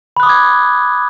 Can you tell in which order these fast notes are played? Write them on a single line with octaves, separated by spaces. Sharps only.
B5 F#6 D#6 D6 G#6